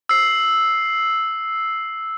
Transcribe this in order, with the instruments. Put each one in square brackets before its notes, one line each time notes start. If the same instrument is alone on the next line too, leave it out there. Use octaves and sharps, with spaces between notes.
[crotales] E6 C7